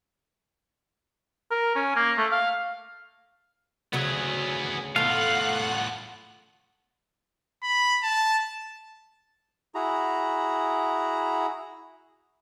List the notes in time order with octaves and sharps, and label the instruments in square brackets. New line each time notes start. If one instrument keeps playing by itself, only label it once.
[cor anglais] A#4
C#4
A#3
A3
F5
[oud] D2 C#3 F#3 [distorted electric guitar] B3 G#4
[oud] E2 A3 [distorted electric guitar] A2 F4 [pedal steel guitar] F5 [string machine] F#5 F#6
[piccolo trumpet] B5
A5
[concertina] E4 F#4 G#4 A#5